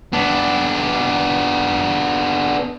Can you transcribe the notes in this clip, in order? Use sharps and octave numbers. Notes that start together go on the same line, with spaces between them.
B3 D4